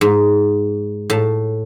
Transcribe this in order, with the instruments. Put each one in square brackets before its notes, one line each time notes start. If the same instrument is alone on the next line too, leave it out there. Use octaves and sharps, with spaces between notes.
[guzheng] G#2
A2 A5